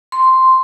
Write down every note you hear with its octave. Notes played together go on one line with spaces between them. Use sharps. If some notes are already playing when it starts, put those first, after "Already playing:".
C6